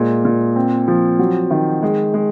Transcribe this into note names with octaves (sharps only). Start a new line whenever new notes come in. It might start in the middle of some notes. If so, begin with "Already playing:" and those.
Already playing: A#2 G#3
A#2
C4
F3
F#3
D#3
G#3
G#3